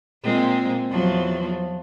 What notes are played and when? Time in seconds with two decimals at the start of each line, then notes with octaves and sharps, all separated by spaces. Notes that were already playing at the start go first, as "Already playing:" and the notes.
0.23 A#2 G#3 C4
0.90 E2 F3 F#3